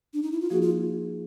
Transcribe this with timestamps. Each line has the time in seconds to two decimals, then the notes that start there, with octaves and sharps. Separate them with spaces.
0.14 D4
0.23 D#4
0.32 E4
0.41 F4
0.50 F3 A#3 D#4 F#4 G#4
0.62 F4